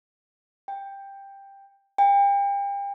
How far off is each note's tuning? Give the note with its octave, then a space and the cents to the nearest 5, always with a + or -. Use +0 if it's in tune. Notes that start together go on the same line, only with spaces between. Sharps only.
G5 +10
G5 +35